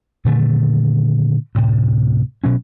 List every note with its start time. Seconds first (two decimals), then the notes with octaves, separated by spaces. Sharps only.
0.25 A#2 D3 D#3 A3
1.55 D2 A2 C3
2.44 B2 F#3 C#4